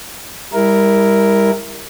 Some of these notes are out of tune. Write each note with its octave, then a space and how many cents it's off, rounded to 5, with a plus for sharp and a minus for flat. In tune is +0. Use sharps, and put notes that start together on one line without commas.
G3 +30 E4 +0 A#4 +0